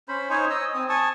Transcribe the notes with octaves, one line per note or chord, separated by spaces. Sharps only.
C#4 C5 B5
D#4 C5 C#5 G#5
D#5 D#6 E6
C4 D#6
G#5 A5 C#6 D#6